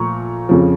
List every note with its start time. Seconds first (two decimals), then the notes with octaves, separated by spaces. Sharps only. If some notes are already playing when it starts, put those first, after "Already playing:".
Already playing: A#2 F3 A3 A#5 C#6
0.49 F2 C#3 F3